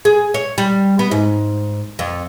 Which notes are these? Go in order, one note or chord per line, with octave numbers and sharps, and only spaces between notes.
G#4
C#5
G3
B3
G#2
F2